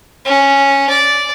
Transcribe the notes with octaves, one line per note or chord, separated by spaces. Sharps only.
C#4
D5